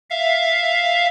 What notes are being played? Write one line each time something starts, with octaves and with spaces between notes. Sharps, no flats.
E5 F5